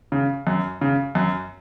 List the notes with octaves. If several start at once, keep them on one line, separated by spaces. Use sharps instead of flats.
C#3
F#2
C#3
F#2